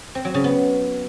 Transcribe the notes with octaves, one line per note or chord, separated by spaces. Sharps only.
C4
F#3
C#3
B3